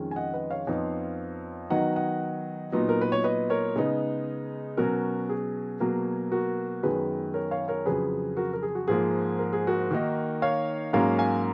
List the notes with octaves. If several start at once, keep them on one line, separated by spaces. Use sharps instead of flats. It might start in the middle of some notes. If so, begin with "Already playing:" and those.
Already playing: F2 D#3 G#3 C#4
G#5
D#5 F#5
B4 D#5
C#5 F5
F2 F3 B3 D#4
D#3 F#3 B3 D#4 D#5 F#5
D#5 F#5
A#2 F#3 B3 D#4
A#4
B4
C#5
B4 D#5
A#4 C#5
C#3 G#3 B3 D#4
B2 F#3 C#4 F#4 A#4
G#4
B2 F#3 A#3
F#4 A#4
F#2 D#3 G#3 B3 G#4 B4
A#4 C#5
C#5 F5
A#4 C#5
F2 C#3 F#3 G#4 B4
F#4 A#4
A#4
G#4
F#4
G#2 F3 A#3 G#4
A#4
G#4
F#4 A#4
D#3 A#3 D#4
C#5 F5
G#2 F#3 A#3 C#4 C#5 F5
F5 G#5